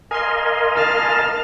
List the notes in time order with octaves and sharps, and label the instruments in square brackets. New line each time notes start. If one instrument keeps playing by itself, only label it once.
[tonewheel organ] A#4 D#5 F5 [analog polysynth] G#5 C6
[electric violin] A5 F6